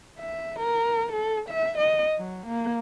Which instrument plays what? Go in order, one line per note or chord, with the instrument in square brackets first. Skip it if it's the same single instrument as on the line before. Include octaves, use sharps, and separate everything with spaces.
[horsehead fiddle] E5
A#4
A4
E5
D#5
F#3
A#3